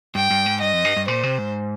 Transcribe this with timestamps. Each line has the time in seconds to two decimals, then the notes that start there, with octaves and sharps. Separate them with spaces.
0.15 G2 G5
0.31 G2
0.46 G#2
0.61 G2 D#5
0.73 F2
0.85 G2
0.96 G2
1.08 A#2 C5
1.23 C3
1.38 G#2